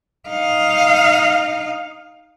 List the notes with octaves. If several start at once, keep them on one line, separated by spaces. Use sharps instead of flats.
D#4 F5